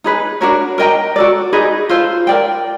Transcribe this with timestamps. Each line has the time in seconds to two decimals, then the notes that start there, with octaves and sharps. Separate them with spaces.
0.04 D#4 G#4 B4
0.41 D4 F#4 A#4 C#5
0.78 A#4 D#5 G5 A#5
1.16 F#4 A4 D5
1.53 D#4 G#4 B4 D#5
1.89 F4 A4 C5
2.27 A#4 D5 G5